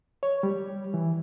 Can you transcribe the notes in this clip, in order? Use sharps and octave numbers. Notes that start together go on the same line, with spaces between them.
C#5
G3
E3